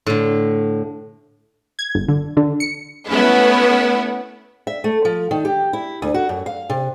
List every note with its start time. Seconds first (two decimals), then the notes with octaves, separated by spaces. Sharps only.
0.06 A2 D3
1.79 G#6
1.95 G1
2.08 D3
2.37 D3
2.60 C#7
3.08 A3 B3 C#4 E4 B4
4.67 E5
4.84 A3
5.05 F3
5.31 D#3
5.45 G4
5.73 E4
6.02 D2
6.14 F#4
6.29 F#2
6.46 F5
6.70 C3